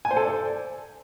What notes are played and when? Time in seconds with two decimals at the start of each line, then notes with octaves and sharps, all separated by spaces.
0.05 G#5
0.11 C5
0.17 A4
0.22 D5